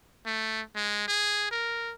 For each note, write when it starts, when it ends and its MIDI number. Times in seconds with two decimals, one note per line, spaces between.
0.26 0.61 57
0.75 1.04 56
1.08 1.48 68
1.51 1.93 70